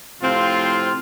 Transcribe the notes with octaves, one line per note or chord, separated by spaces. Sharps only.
A2 C3 F3 C4 F4